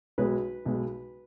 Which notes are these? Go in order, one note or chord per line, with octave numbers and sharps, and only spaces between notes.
B1 B2 G#3 B4
B1 B2 G#3